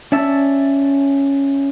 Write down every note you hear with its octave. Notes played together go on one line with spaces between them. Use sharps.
C#4 D5 E5 A5 E6